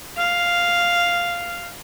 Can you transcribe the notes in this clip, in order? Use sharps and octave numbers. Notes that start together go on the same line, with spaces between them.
F5